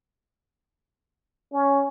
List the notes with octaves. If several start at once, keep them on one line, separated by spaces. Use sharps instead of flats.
C#4